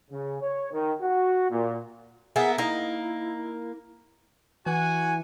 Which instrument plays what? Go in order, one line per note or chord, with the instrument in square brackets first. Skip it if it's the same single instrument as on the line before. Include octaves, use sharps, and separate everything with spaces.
[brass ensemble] C#3
C#5
D#3
F#4
A#2
[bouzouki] A#3 B3 E4 [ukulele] G#4 F#5
[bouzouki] A#3 [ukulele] D#4 D#5 [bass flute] E4
[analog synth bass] E3 [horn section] F#4 F#5 G#5